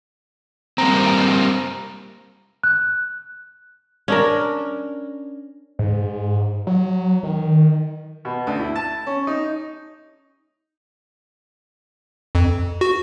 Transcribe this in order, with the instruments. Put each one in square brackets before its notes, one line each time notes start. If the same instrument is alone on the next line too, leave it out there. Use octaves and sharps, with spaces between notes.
[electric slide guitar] G3 A#3 C4 [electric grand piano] A#5
[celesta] F#6
[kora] C#4 D4 A#4
[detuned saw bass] G#2
F#3
D#3
[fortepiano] B2
D2
E4
A5
C#4
D#4
[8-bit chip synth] F2
F#4